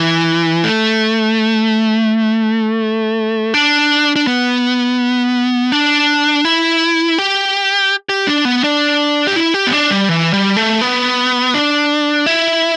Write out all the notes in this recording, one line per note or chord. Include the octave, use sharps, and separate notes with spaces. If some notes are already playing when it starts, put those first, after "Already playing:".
Already playing: E3
A3
D4
D4
B3
D4
E4
G4
G4
D4
B3
D4
G4
E4
G4
B3
D4
G3
E3
G3
A3
B3
D4
E4